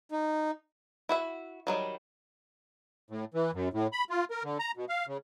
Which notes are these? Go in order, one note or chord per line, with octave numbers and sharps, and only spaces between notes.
D#4
E4 F#4 E5
D#3 F#3 G3
A2
E3
F#2
A2
B5
F4
A#4
D3
A#5
B2
F5
C#3